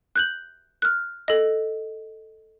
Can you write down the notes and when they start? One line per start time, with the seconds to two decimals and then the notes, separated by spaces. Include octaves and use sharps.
0.16 F#6 G6 F#7
0.82 F6 F#6
1.28 A4 D#5